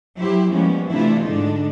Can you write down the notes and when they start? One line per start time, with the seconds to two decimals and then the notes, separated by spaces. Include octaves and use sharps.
0.18 F#3 E4 G4 C5
0.52 F3 G3 G#3 A#3 B3 C#4
0.92 C3 E3 A3 D4 E4 F4
1.26 G#2 D3 G#3 D4 D#4